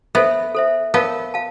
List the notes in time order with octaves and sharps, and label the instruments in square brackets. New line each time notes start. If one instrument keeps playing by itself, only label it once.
[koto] B3 [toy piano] A4 C5 E5
[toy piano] A4 C5 E5
[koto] B3 [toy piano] A#4 C#5 F5 A5
[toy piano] F5 A5